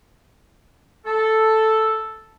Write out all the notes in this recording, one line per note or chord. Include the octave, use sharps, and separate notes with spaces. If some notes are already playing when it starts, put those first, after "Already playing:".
A4